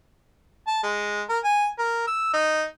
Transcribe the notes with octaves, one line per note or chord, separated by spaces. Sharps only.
A5
G#3
A#4
G#5
A#4
E6
D#4